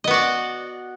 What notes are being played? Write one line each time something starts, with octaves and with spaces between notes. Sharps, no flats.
B3 F#4 D5 D#5